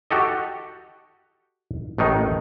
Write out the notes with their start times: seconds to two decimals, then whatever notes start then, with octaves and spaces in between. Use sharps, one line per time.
0.11 F#4 G4 A4 D#5
1.98 A1 A2 D#3 D#4